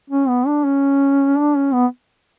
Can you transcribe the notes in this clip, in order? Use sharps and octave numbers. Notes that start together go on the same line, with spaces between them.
C#4
B3
D4
C#4
D4
C#4
B3